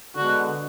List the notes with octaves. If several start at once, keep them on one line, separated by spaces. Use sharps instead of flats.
D3 G#3 B3 F#4